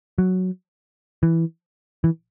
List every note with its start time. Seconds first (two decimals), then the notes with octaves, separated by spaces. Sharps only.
0.18 F#3
1.23 E3
2.04 E3